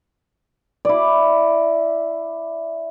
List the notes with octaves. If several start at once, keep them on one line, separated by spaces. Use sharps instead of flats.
E4 D5